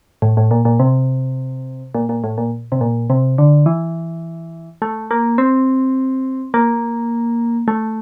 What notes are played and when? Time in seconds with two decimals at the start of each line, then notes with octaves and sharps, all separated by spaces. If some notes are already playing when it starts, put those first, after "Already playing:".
0.22 A2
0.37 A2
0.51 A#2
0.65 A#2
0.79 C3
1.95 A#2
2.09 A#2
2.24 A2
2.38 A#2
2.72 C3
2.81 A#2
3.10 C3
3.38 D3
3.66 E3
4.82 A3
5.11 A#3
5.38 C4
6.54 A#3
7.68 A3